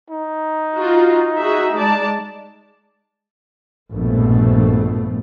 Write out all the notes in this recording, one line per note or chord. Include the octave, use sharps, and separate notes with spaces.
D#4
F4 F#4
F#4 G#4 E5
G#3 D5 A5
A#1 G2 B2 F3 A3